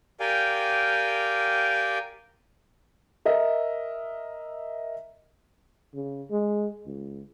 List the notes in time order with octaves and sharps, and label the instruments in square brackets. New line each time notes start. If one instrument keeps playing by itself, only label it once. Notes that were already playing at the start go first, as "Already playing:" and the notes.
[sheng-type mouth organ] G4 A#4 D5 F5 G5 G#5
[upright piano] A#4 D#5 E5
[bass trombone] C#3
G#3
C#2